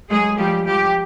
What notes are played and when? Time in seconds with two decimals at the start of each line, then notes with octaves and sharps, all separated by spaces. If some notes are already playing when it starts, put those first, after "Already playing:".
0.10 F#3 G#3 G#4
0.38 F3 G3 G4
0.66 F3 G3 G4